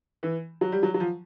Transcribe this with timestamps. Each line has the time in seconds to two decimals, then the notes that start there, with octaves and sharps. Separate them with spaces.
0.23 E3
0.61 F#3
0.72 G3
0.83 F#3
0.94 F#3
1.00 F3